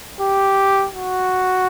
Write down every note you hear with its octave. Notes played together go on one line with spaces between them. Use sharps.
G4
F#4